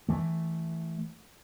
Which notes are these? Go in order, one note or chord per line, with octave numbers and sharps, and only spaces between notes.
E3 A3